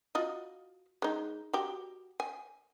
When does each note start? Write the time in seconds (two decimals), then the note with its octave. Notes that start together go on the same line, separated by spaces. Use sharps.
0.15 F4 F#4 D#5
1.02 G#3 D#4
1.53 F#4 G4
2.20 G#5